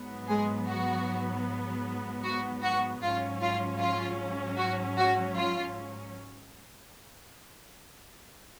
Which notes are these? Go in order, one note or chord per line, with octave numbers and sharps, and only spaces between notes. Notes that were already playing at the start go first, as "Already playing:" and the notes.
Already playing: G#2 F#3 B3
G#3 G#4
F#4
F#4
F#4
G#2 F#3 C#4 F4
F4
F4
F#4
F#4
F4